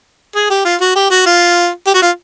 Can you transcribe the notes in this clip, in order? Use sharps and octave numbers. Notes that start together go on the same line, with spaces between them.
G#4
G4
F4
F#4
G4
F#4
F4
G4
F#4
F4